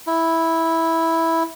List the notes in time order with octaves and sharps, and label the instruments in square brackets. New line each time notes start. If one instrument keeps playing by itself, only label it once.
[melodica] E4